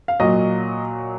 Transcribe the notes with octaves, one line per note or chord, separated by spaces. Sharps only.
F5
A#2 F#3 D#5